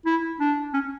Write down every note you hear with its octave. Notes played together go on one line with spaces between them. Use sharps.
E4
D4
C#4